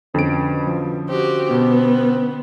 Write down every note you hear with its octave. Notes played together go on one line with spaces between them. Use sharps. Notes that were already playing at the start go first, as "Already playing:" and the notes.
F2 B2 D3 C#4 D7
F3
C4 F#4 G4
B2 B3